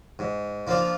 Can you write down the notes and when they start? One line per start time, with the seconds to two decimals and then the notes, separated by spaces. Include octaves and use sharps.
0.19 G#2
0.67 F3 A#3 D4 F4